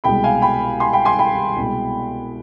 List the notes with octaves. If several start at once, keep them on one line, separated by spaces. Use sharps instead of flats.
C2 B2 G#3 G5 B5
F5 G#5
G5 B5
G#5 C6
G5 B5
G#5 C6
G5 B5
C2 B2 G#3